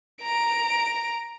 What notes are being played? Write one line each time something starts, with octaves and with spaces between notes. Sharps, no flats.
A#5 D7